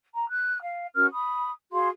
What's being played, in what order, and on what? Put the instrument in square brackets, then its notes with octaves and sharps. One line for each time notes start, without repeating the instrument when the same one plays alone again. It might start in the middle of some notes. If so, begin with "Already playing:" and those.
[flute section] A#5
F#6
F5
C#4 F#4 A#4 F6
B5 D#6
F#4 G#4 F5 C6